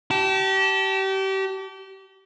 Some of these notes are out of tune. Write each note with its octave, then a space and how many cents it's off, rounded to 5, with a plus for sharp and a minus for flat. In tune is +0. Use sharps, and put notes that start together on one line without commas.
G4 -30 A5 +0